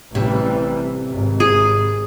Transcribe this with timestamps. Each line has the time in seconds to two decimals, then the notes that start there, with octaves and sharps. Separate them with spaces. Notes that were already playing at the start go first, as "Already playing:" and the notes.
0.15 A1 C3 E3 G3
1.08 G#1 G#2
1.40 G#4